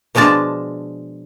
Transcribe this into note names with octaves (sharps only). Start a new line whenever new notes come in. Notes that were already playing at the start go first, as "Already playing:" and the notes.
B2 F3 G#3 D4 A5